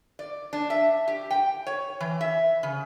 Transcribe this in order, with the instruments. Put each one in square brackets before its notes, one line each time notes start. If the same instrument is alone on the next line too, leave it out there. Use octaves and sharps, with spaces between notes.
[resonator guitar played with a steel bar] D5
D4
E5
G4
G5
C#5
E3
E5
C#3